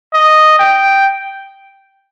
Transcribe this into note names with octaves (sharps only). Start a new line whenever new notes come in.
D#5
G5